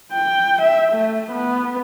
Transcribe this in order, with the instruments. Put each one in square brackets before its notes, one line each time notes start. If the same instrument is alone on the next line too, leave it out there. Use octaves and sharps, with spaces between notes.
[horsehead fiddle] G5
E5
A3
B3